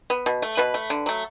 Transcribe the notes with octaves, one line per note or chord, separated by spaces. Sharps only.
B3
B2
A3
B2 B4
A3
D3
F#3 A3